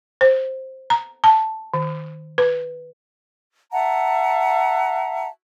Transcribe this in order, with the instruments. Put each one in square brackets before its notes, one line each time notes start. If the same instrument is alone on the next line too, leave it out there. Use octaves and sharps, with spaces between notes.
[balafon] C5
A#5
A5
D#3
B4
[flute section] E5 F#5 A5 A#5